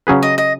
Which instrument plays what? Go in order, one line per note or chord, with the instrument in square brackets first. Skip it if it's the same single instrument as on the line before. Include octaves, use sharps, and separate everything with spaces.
[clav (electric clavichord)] C#3 F#3 C#4 G#4 B4
[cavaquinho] D#5
D#5